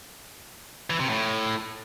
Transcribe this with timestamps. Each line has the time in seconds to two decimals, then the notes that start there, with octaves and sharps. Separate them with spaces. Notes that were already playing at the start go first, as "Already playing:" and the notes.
0.90 E3
1.00 C3
1.10 A2